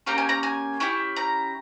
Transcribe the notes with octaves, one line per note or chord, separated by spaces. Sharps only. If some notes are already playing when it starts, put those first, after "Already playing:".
A#3 C#4 G4 A#5
G#5
A#5
G#5
C#4 E4 G4
A#5